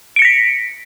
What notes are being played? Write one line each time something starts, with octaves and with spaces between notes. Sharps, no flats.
A#6 B6 C#7 D7